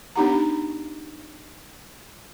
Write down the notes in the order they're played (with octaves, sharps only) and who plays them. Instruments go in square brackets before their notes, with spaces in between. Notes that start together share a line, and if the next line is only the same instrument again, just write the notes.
[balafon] B3 D4 D#4 G4 F#5 A#5